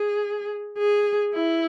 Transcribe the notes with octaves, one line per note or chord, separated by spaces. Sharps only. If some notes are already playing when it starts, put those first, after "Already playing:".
Already playing: G#4
G#4
E4